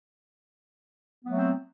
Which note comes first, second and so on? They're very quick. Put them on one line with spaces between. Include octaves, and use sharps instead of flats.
B3 F#3 A3 C4